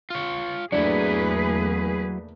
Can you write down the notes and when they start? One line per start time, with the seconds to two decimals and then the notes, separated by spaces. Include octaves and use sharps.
0.10 F4 C#5
0.72 E2 F#3 A3 A#3 D4 E4 G#4 B4